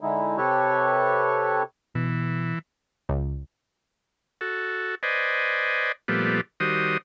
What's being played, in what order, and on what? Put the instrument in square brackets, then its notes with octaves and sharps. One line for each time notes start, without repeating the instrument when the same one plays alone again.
[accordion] D3 G#3 D#4 E4
C3 G4 A4 B4 C#5 C#6
[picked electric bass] B2 [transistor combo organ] E3
[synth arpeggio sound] C#2
[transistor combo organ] F#4 A4
B4 C5 D5 D#5 G#5
A#2 F3 G3 A3 B3
D#3 G3 F#4 C5 D#6